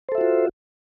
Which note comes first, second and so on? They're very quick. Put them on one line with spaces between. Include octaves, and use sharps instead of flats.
C5 A4 E5 F#4 F4